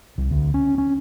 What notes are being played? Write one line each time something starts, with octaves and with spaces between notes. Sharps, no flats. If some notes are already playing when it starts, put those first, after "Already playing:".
C2
D2
C#4
C#4